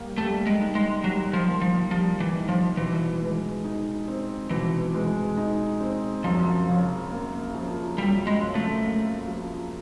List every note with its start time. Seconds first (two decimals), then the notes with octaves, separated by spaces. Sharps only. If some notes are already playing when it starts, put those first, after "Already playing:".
Already playing: G3 A#3
0.18 G3 A3
0.47 G#3
0.60 D#4
0.75 G#3
1.04 F#3 G3
1.33 F3
1.48 A#3
1.61 F3
1.91 F3 G3
2.20 E3
2.34 D#4
2.49 F3
2.77 B2 E3
3.21 G#3
3.64 D#4
4.08 C4
4.51 B2 E3
4.94 G#3
5.37 D#4
5.81 C4
6.24 F#2 F3
6.68 C#3
7.12 A#3
7.55 F3
7.98 F#2 G3
8.27 G#3
8.42 C#3
8.55 A3
8.84 A#3
9.28 F3